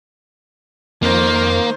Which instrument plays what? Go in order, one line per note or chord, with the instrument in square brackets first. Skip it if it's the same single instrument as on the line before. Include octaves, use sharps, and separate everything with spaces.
[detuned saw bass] F2 [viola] D#3 C5 [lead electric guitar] A#3